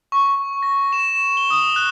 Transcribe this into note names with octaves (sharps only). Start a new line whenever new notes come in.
C#6
A#6
E7
G7
D#6
F#6